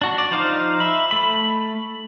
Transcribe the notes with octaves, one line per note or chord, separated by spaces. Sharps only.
D4 F#4
D5
F3 D#4 C5 F5
E5 B5
A3 B5